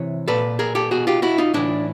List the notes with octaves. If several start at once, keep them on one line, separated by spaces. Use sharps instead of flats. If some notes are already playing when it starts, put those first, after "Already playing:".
Already playing: C3 E3 C#5
A#2 A4 B4
G#4 A#4
G4 A4
B2 F#4 G#4
F4 G4
E4 F#4
D#4 F4
A2 E3 D4 E4